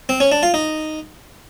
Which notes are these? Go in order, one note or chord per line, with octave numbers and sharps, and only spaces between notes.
C4
C#4
D4
F4
D#4